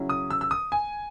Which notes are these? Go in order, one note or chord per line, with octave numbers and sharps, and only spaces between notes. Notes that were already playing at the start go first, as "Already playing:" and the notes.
Already playing: C#3 F#3 C#4 E4
D#6
E6
E6
D#6
G#5